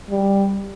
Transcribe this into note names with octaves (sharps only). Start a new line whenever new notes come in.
G3